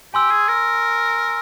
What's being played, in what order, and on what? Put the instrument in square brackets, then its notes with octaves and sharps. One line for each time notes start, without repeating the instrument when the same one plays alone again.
[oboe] G4 [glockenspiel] G#5 C6 E6
[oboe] G#4
A#4